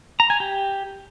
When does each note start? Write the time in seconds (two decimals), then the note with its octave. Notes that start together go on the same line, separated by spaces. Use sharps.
0.20 A#5
0.30 G#5
0.40 G4